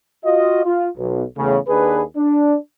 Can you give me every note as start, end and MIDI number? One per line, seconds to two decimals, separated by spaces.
0.25 0.64 65
0.25 0.64 66
0.25 0.64 75
0.64 0.87 65
0.98 1.23 35
1.37 1.57 40
1.37 1.57 45
1.37 1.57 49
1.69 2.01 39
1.69 2.01 62
1.69 2.01 68
1.69 2.01 71
2.17 2.56 62